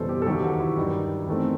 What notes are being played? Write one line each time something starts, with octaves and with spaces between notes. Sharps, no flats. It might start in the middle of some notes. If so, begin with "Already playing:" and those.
Already playing: F#1 E2 B2 G3 A4 C5
G4
A4
E1 D#2 D#3 F#3 G4
F#4
E4
G2 D#3 G3
E2 D#3 A3 C4